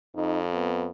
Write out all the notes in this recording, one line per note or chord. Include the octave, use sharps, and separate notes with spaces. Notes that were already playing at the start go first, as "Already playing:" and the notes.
F2 D#4
B3